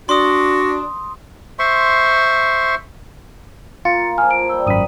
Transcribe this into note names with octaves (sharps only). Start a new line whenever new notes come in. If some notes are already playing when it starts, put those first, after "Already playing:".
D4 F#4 C6 D#6
C5 E5 C6 C#6
A#3 F4 A6 C#7
F3 G#4 G#5 F6
D7
G3 G5 E6
G#1 F#2 B5 D#6 D#7